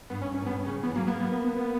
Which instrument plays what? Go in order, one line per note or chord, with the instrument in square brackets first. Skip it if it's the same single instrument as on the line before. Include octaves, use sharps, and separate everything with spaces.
[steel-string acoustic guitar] G2 [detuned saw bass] B3
[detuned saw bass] C#4
C#4
[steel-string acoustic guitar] A#2
[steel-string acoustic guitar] G2 [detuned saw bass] B3
[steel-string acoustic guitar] C#3 [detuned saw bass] C#4
[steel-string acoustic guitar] E3 [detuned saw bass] B3
[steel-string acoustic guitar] F#3 [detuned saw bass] A#3
[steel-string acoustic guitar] A#3 [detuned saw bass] B3
[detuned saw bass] B3
B3
B3
B3